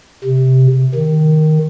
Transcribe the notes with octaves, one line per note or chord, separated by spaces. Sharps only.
C3
D#3